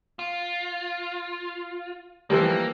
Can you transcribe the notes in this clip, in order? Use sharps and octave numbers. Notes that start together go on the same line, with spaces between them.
F4
E3 F3 G3 A#3